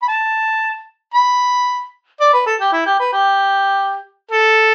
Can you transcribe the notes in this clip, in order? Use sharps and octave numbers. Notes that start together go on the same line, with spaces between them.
B5
A5
B5
D5
B4
A4
G4
E4
G4
B4
G4
A4